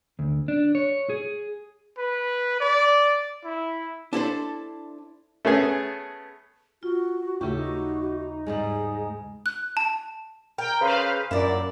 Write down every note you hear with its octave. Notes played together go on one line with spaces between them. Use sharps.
D2
D4
C#5
G#4
B4
D5
E4
D4 E4 A4 C5
A3 B3 C#4 G#4
F4 F#4
D#2 C#3 A3 E4 G4
D#4 F#4
G#2 G3 G#3 G#4
F#6
A5
A#4 G5
C#3 B4 C5 F5
F#2 A#2 E4 D5